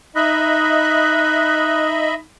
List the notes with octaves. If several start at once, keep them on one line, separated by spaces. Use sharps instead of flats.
D#4 D#5 E5 B5 F#6